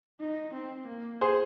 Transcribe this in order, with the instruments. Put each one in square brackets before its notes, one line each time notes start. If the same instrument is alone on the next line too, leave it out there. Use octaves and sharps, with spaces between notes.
[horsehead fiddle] D#4
C4
A#3
[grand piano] G#4 C5